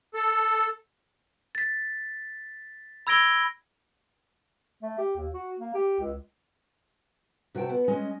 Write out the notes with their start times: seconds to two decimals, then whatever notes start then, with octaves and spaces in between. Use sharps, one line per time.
0.14 A4
1.55 A6 B6
3.07 B5 E6 G#6 A#6 D7 G7
4.83 A3
4.98 G4
5.16 D#2
5.33 F#4
5.59 A#3
5.74 G4
6.00 C#2
7.55 C3 F#4 C5 G5 A5
7.69 B3
7.88 G#3 C#4 D#5 G#5